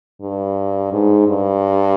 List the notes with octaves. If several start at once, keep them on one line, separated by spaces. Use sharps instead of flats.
G2
G#2
G2